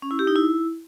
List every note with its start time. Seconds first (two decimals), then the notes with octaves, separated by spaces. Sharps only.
0.02 C#4
0.11 E4
0.19 G4
0.27 D#4
0.36 E4